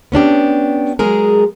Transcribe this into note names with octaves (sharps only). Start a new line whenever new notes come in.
B3 C#4 D4 G4
F#3 G#3 G#4 A#4